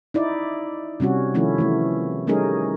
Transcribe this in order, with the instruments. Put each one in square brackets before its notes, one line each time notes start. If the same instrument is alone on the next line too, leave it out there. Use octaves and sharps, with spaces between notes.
[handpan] D#4 E4 D5
C3 G3 C#4 F#4
D#3 F3 A3 C#4 E4
E3 A3
G3 A3 C#4 D#4 G#4 A#4